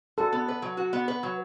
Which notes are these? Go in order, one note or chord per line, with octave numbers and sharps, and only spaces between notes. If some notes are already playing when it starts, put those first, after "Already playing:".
F#4 A4
B3
B4
F#3
F#4
B3
B4
F#3